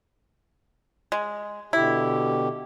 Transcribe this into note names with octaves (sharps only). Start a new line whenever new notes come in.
G#3
B2 D3 E4 G4